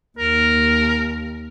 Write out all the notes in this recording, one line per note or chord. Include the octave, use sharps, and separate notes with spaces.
D#2 A#4